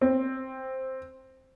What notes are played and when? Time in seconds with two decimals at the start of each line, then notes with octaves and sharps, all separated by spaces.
0.01 C4